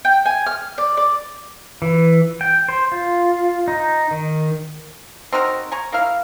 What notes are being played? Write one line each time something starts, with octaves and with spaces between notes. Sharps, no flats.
G5
G#5
F6
D5
D5
E3
G5
C5
F4
D#4
D#3
C4 D#4 F#4 A#4
G#5 A#5 C#6
A#3 E4 A#4 F5